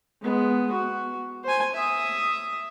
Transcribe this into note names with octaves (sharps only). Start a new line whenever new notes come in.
G#3 B3
F#4
C5 G#5
E5 D#6